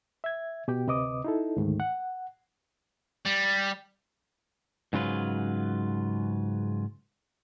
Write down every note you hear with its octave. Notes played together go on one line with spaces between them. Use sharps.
E5 G#6
B2 G4 G5
D2 C3 B4 D#5 D6 D#6
D#4 E4 A4
D2 G#2 D#3 A3
F#5
G3
G#2 C#3 F#3 F4 B4